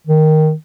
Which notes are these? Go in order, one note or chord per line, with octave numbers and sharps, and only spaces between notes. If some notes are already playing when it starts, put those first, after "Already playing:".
D#3